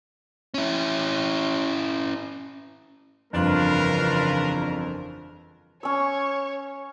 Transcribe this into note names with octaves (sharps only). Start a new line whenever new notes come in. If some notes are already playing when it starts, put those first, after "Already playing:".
C#4 E4
G1 F2 C#3 E3 D4 F4 A#4 B4
C#4 C#5 E6